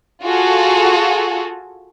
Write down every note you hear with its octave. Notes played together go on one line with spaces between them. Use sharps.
F4 F#4 G#4 A4